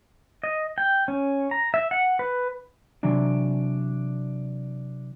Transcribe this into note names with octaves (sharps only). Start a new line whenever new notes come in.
D#5
G5
C#4
A#5
E5
F#5
B4
C3 E3 F#3 D4